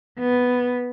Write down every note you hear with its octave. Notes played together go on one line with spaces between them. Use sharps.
B3